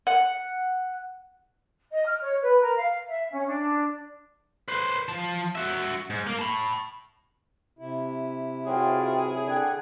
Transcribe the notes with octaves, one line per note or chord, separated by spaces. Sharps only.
F#5
D#5
F6
C#5
B4
A#4
F5
E5
C#4
D4
B4 C5
F3 A5
F#4 E5
G#2
A#3
A5 B5
C3 E4
C#2 G#2 F#3 F4 G#4 G5 C6
D3 F#5 G5 G#6